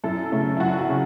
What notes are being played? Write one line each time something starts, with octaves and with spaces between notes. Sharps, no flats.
F#2 E4 A4
C#3 A3
E4
F#2 F#4
F#4
C#3